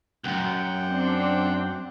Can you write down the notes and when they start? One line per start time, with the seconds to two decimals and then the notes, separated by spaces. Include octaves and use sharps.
0.24 C2 F#2 F#5 G5
0.87 C4 D4